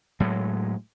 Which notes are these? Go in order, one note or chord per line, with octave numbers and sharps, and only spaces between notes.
A2 F#3 G#3